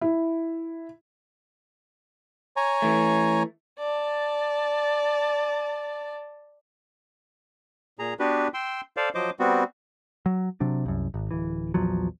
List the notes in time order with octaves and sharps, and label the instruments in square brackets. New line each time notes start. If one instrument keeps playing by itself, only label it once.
[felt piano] E4
[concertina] C#5 G#5 A#5
[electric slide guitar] E3 A3
[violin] D5 A5
[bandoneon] A#2 G#4 A#5
B3 D4 F#4 G4 B4
G5 C6 E6
A4 C5 D5 F5
F3 F#3 C5 D#5 D6
G3 B3 C4 F#4
[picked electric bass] F#3
C3 F#3 D4
C2 F#2
G#1
D1 E3
A#1 E2 F3 F#3